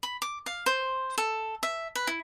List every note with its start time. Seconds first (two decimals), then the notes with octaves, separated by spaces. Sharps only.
0.03 B5
0.22 D6
0.46 F5
0.66 C5
1.18 A4
1.63 E5
1.95 B4
2.07 E4